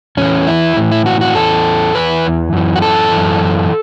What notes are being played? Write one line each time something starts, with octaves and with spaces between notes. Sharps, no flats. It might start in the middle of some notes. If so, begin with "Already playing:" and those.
E2 E3 C#4
E4
A2 E3
E4
F#4
F#4
E2 E3 A4
E2 C#3 E3 B4
F#2 E3
F#4
A4
F#2 E3